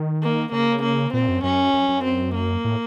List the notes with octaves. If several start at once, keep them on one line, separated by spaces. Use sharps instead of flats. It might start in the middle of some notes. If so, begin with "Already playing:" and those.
Already playing: D#3
A#3
C#3 A#3
A#3
A#2 C4
F#2
F#2 C#4
F#2
F#2
C4
A#3
A2